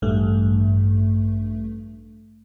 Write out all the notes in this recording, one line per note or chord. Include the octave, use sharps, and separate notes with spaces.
A1 G2 A3